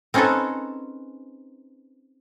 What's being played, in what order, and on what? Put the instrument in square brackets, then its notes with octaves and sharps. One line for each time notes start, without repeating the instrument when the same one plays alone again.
[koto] C4 C#4 D#4 G#4 A4 B4